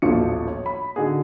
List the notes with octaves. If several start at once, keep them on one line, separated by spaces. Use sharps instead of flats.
D#1 A1 B2 F3 C#7
C#5
B5
D3 D#4 F#4 G#4